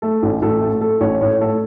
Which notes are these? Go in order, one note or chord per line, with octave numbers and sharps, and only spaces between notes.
A3 A4
A1
A1 A4
A3
A3 A4
A1 C#5
A2 C#5
A3 A4